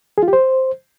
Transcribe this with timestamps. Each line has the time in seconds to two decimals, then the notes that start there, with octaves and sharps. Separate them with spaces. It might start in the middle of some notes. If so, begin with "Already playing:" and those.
0.18 G#4
0.23 F4
0.28 G4
0.33 C5